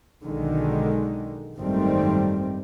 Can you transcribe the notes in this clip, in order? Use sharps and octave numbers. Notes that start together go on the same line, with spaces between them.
B1 D3 D#3 G#3
G#1 F#2 D#3 G3 A3 C4